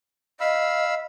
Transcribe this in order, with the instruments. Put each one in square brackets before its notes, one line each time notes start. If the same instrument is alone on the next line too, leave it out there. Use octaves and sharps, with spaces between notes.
[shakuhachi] D#5 [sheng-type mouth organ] F5 B5 E6